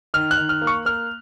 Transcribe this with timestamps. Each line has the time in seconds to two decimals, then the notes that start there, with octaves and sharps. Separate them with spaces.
0.14 D#3 F6
0.31 F#6
0.37 D#3
0.49 F6
0.61 A#3
0.67 C#6
0.85 A#3 F6